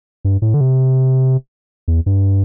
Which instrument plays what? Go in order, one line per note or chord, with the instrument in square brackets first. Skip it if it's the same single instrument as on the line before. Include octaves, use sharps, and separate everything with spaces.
[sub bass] G2
A2
D3
C3
E2
G2